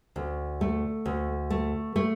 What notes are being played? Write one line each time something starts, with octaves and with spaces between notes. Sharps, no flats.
D2
A3
D2
A3
A3